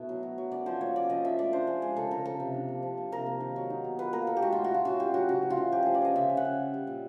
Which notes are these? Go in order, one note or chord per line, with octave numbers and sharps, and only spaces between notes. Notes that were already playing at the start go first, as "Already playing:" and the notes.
Already playing: B2 A3 E4
F#3
F#3
F#3
C#4 D5
F3 C5
A#3 C#5
C#4 D5
F3 D#5
F3 E5
A3 D5
D4 C5
F3 G#4
G#3 G#4
C#3 A4
C#3 A#4
F3 A4
C3
D4
A#3
F3
A#3
C3 A#4
A#3
D#3
F#3
D#4
B2
F4 B4
A#3 A#4
A#3 A4
G4
G#3 F#4
A2 F4
F#4
G#3 F4
C#4 F#4
F4 G4
F#3 F#4
C#3 F#4
E3
F4
C#3
F3 G4
F3 G#4
D5
F3 D#5
C#3 E5
C#3
F#5
C#3
G3
G3
A#2